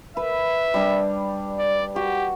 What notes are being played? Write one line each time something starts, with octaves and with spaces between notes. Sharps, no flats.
B4 E5
G3 D4
D5
F#4 G4